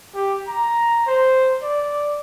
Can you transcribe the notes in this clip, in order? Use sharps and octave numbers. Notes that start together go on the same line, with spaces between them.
G4
A#5
C5
D5